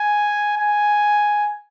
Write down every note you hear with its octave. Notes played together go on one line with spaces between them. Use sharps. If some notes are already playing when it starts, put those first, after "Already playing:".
Already playing: G#5
G#5